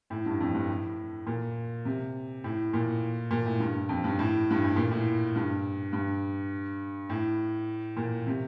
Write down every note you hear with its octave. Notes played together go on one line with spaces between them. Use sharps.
A2
G2
F2
G2
A2
A#2
C3
A2
A#2
A#2
A2
G2
F2
G2
A2
G2
A2
A#2
A2
G2
G2
A2
A#2
C3